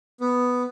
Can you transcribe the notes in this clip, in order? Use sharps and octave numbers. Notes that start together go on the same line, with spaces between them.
B3